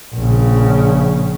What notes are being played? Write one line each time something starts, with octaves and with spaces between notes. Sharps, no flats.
A#1 C#3